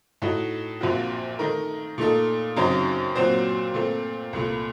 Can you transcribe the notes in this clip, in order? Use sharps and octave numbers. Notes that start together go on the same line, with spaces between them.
A2 A3 D#4 F#4
A#1 A#2 F3 C4 F#4
D#3 A3 D#4 A#4
A#2 A3 D#4 A4
F#2 C#3 F#3 C4 D#4
A#2 F#3 C4 F#4 C5
A#2 A3 C4
C2 A#2 A3